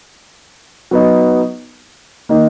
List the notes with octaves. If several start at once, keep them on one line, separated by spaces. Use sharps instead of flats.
F#3 B3 D#4
D#3 A#3 D#4